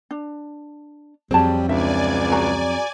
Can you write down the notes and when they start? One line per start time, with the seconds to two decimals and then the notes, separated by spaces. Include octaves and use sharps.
0.11 D4
1.31 F2 F#3 G3 C4 G#4 A5
1.69 C#2 D4 F4 D5 E5 G#5
2.32 F#4 G#4 A#5